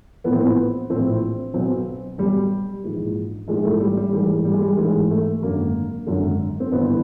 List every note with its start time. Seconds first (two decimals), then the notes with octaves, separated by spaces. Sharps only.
0.24 A#1 A2 E3 B3
0.32 C4
0.40 B3
0.90 A#1 A2 E3 C4
1.54 B1 B2 C4
2.18 B1 B2 G3
2.83 A#1 G#2 E3
3.48 A#1 G#2 E3 G#3
3.65 A3
3.80 G3
3.97 G3
4.13 A1 G#2 E3 G3
4.45 G3
4.53 G#3
4.61 G3
4.77 A1 G#2 E3 G#3
5.11 A3
5.42 G#1 F#2 D3 A#3
6.07 G#1 F#2 D3
6.60 C4
6.72 G1 G2 E3 B3